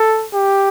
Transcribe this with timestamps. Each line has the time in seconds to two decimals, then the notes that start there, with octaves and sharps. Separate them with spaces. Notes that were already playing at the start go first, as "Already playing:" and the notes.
Already playing: A4
0.34 G4